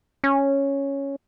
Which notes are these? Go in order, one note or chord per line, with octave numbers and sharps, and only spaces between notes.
C#4